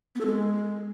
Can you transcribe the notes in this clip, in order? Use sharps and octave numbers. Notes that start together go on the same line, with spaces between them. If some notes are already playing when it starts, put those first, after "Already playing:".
B3
A4
G#3